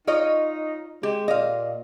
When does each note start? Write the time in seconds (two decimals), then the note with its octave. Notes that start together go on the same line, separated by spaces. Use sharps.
0.07 D#4 F4 C#5 D#5
1.03 G#3 G4
1.28 A#2 D#5 F5